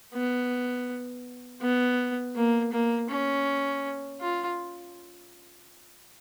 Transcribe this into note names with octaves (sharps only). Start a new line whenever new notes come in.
B3
B3
A#3
A#3
C#4
F4